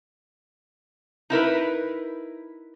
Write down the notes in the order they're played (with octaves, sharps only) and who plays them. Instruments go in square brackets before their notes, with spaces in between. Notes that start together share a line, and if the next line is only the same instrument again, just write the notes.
[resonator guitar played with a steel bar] D#4 E4 A#4 B4